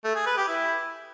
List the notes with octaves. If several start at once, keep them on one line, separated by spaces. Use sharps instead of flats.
A3
G#4
B4
G4
E4